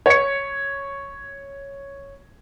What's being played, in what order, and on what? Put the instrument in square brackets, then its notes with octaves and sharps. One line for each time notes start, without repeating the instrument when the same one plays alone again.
[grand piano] C#5 C#7